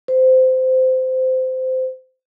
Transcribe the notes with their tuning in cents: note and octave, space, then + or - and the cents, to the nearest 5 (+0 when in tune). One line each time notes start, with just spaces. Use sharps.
C5 -20